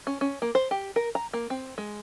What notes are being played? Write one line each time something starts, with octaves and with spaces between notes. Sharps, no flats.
C#4
C#4
A#3
C5
G4
A#4
A#5
A#3
C4
G#3